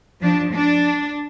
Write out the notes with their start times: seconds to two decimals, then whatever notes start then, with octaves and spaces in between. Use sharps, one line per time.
0.21 F3 D4
0.53 D4